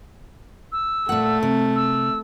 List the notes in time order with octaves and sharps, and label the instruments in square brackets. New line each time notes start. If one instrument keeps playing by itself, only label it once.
[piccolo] E6
[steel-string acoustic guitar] A#2 F#5 [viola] A3
[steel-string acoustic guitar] C3
[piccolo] E6